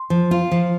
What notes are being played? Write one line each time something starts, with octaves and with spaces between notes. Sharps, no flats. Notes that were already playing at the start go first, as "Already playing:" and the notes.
Already playing: C6
F3
F4
F3